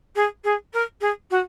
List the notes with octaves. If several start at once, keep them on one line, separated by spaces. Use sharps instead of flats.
G#4
G#4
A#4
G#4
F#4